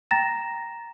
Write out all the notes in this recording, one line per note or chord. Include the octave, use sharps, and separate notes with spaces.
G5 A#5 A6 A#6 E7